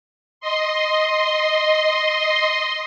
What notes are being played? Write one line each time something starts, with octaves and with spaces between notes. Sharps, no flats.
D#5 C6